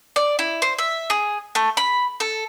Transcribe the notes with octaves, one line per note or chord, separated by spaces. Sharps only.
D5
E4
C5
E5
G#4
A3
B5
A4